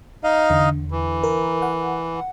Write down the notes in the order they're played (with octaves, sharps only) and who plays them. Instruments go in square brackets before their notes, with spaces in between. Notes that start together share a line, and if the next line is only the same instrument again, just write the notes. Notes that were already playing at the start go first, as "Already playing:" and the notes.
[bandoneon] D#4 D#5 F5
[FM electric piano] E2 D3
[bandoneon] E3
[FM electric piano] A#4
F#5